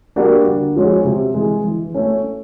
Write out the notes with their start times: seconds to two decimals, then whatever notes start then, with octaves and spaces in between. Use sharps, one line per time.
0.16 G3 A#3 D4 F#4
0.46 D3
0.76 F3 G#3 C#4 F#4
1.05 C3
1.34 E3 G#3
1.65 E3
1.94 A3 C#4